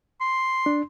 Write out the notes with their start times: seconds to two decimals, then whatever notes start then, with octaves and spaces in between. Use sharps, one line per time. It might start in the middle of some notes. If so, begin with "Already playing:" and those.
0.21 C6
0.66 D4